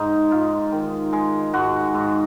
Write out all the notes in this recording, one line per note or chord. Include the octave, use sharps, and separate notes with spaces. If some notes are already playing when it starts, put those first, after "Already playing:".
Already playing: G#2 D#4
G#2 F4
D#3
G#3
G#2 F#4
G#2